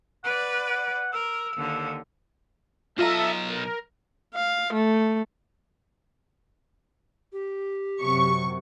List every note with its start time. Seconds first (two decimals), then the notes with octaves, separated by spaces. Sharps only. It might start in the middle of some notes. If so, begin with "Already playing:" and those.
0.24 B4 D5 F#5
0.69 F#5
1.13 A#4 E6
1.56 D#2 D3
2.98 B1 F4 A4 D#5 E5 A#5
3.48 A#4
4.34 F5
4.73 A3
7.33 G4
8.01 F#2 C3 F#3 C#6